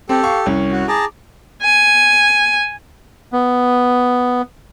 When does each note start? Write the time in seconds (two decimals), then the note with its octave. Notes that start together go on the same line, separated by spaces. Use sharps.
0.09 C4 G4 A4
0.23 F5 C#6
0.46 C2 C#4
0.71 F#4
0.88 G#4 A5 A#5 D6
1.63 G#5
3.33 B3